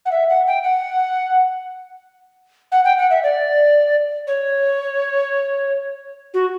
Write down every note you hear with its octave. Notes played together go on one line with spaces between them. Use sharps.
F#5
E5
F#5
G5
F#5
F#5
G5
F#5
E5
D5
C#5
F#4